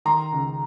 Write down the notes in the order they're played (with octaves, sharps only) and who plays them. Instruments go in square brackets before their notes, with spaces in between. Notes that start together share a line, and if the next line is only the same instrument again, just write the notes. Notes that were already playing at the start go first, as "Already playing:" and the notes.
[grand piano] D#3 A#5 C6
C#2